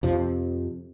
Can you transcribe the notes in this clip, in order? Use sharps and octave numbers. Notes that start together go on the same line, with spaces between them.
F2 C3 F3